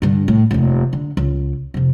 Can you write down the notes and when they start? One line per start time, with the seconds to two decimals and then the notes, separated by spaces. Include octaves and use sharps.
0.02 G2 D3
0.28 A2
0.51 F1 D#2
0.93 D3
1.17 C#2
1.74 F2 C3